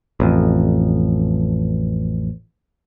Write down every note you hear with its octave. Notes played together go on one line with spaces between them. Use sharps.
A1 F2